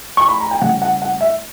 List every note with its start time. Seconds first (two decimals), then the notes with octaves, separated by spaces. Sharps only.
0.17 C#6
0.29 B5
0.40 A#5
0.51 G5
0.61 C#3 G3 C#4 F#5
0.82 F#5
1.02 F#5
1.21 E5